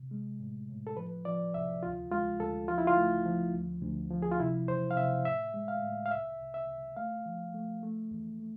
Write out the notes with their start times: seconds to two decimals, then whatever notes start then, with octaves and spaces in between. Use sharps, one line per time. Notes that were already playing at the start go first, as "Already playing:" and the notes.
Already playing: C3
0.11 G#3
0.40 A2
0.69 A2
0.87 A4
0.97 F3 B4
1.25 F3 D5
1.54 C2 E5
1.83 D2 F4
2.11 G#3 F4
2.40 D2 A4
2.68 F3 F4
2.78 E4
2.87 F4
2.97 A3
3.26 F3
3.54 D2
3.82 D2
4.11 F3
4.22 G#4
4.31 F4
4.40 C3 E4
4.68 E2 C5
4.91 F5
4.97 C3 E5
5.25 A2 E5
5.54 G#3
5.68 F5
5.82 A2
6.06 F5
6.11 C2 E5
6.40 C2
6.54 E5
6.68 C2
6.97 A3 F5
7.26 F3
7.54 A3
7.83 A3
8.11 E2
8.40 A3